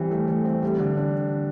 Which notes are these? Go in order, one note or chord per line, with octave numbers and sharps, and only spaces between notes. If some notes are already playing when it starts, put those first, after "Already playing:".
Already playing: E3 G3 C4
A3
A3
C4
G3
D3
D4